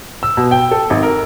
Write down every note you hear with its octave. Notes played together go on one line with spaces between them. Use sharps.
E6
B2
G5
A4
G#1
A#4